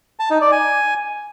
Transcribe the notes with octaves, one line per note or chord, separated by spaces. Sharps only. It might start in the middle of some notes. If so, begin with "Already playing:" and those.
A5
D#4
D5
G#5